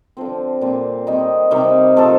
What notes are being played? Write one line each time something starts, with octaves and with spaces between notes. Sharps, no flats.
D3 F3 C4
A#2 G3 C4
D#3 G3 C4 D#4
C3 D#3 G3
F3 A3 D#4 A4